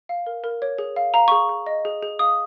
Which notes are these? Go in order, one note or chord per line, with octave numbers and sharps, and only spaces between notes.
F5
A#4
A#4
C#5
G#4
F5
F5 A#5
C#6
G#4
G#4
D#5
G#4
G#4
F5 D#6